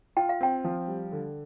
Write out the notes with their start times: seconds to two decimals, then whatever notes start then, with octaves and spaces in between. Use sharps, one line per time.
0.17 F4 G5
0.29 F5
0.41 C4 G5
0.64 F3
0.88 G3
1.12 D3